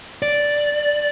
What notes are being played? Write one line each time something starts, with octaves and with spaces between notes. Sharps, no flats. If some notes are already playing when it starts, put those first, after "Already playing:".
D5